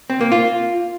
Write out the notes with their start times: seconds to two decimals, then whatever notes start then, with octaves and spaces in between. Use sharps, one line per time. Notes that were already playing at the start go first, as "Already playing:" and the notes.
0.10 C4
0.21 A#3
0.32 F4